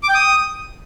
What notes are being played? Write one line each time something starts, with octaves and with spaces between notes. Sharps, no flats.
D6
G5
D#6